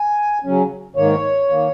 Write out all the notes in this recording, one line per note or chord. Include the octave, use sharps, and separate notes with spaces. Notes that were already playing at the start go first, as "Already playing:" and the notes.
Already playing: G#5
C#3 F#3 C#4
G#2 D#3 A#3 C#5
D#3 A#3